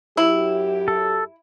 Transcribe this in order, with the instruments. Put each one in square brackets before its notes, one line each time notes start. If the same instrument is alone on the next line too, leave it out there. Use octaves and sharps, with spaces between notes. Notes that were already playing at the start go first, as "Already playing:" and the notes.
[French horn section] F#2 F#3 G4 [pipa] E4
[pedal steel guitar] A4